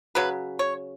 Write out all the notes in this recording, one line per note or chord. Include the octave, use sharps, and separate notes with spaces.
C#3 F#3 B4
C#5